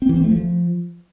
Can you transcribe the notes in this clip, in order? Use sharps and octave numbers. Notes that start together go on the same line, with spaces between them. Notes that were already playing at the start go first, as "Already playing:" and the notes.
C4
E3
C4
A3
F3